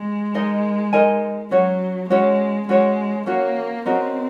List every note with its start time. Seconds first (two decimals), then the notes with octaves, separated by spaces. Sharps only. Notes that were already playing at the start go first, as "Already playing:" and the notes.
Already playing: G#3
0.34 D#4 A#4 D#5 G#5
0.93 D#4 A#4 D#5 G#5
1.51 F#3 C#4 F#4 C#5
2.10 G#3 C#4 F#4 C#5
2.68 G#3 C#4 F#4 C#5
3.26 A#3 C#4 F#4 C#5
3.86 C4 C#4 F#4 A#4 D#5